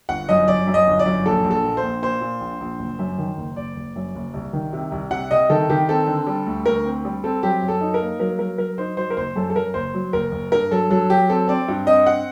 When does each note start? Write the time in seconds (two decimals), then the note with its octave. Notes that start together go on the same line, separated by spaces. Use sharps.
0.09 G1 F#5
0.29 F#2 D#5
0.48 F#2 D5
0.67 F#2
0.74 D#5
0.87 G1
0.99 D5
1.06 F#2
1.25 A#1 A4
1.44 A#1
1.51 A4
1.64 A#2
1.77 C5
1.83 A#1
2.02 A#2 C5
2.21 A#2
2.40 A#1
2.60 A#1
2.79 F#1
2.99 F#2
3.18 D#3
3.37 F#1
3.56 F#1 D5
3.77 F#1
3.96 F#2
4.15 F#1
4.34 C2
4.53 D#3
4.73 C3
4.92 C2
5.11 C3 F#5
5.31 C3 D#5
5.50 D#3 A4
5.70 D#3 G4
5.89 C4 A4
6.07 D3
6.27 G3
6.46 D2
6.66 D2 A#4
6.85 C4
7.05 G3
7.24 C4 A4
7.43 F#3 G4
7.62 F#2
7.68 A4
7.81 D#4
7.94 A#4
8.01 A#3
8.20 F#3 A#4
8.39 F#3 A#4
8.58 F#3 A#4
8.78 D#4 C5
8.97 F#3 C5
9.10 A#4
9.17 F#1 C5
9.36 F#2 A4
9.50 A4
9.55 F#2 A#4
9.74 F#1 C5
9.94 F#3
10.13 F#1 A#4
10.32 F#1
10.52 G2 A#4
10.71 F#3 A4
10.90 F#3 A4
11.10 F#3 G4
11.29 C4 A4
11.48 C4 D5
11.68 G2
11.86 C4 D#5
12.06 F#5